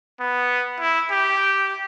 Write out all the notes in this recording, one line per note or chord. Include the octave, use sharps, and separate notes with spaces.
B3
E4
G4